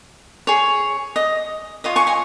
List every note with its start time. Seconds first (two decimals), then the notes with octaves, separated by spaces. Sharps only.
0.47 G#4 C#5
1.16 D#5
1.84 F4 C#5 D#5
1.96 G#5 C#6
2.07 D#5 G#5